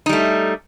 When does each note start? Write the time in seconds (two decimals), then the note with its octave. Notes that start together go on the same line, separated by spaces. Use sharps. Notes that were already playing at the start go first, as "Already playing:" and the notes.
0.06 D#4
0.09 G3
0.13 A3